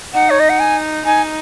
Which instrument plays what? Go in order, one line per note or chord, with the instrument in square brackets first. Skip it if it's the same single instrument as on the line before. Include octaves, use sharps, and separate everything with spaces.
[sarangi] D#4 [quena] F#5
[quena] C#5
D#5
F#5
G#5
[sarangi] D#4 [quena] G#5